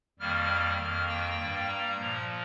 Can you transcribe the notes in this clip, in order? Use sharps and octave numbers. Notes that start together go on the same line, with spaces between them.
F2 D#3 G3 A#3 F6
F2 D#3 A#3
G5
G2 G3 A#3
A#5
A#2 F3 A#3